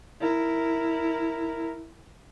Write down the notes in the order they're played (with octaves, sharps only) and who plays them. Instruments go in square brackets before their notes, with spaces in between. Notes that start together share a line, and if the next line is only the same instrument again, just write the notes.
[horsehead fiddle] E4 A#4